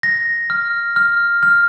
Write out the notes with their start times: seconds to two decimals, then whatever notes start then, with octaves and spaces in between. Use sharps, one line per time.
0.03 A#6
0.50 F6
0.96 F6
1.43 F6